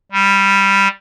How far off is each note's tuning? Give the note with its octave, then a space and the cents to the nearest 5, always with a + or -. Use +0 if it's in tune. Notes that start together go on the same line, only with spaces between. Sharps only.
G3 +5